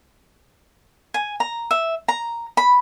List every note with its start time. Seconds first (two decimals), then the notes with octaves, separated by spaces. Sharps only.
1.14 G#5
1.40 A#5
1.71 E5
2.08 A#5
2.57 B5